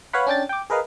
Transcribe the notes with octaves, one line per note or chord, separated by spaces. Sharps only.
B4 C#5 F5 F#5 B5
C#4 D4 G5 A6
G5 D6
G#4 A#4 B4 D#5 F5